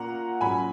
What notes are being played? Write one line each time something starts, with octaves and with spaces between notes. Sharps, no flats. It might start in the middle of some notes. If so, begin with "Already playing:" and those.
Already playing: A#2 A#3 C#4 F#5 A#5
A#2 F#3 C#4 G#5 B5